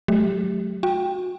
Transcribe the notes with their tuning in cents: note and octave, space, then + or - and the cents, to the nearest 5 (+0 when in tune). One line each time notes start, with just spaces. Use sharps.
F#3 +0 A3 -40 G4 +0
F#4 -30 G5 +5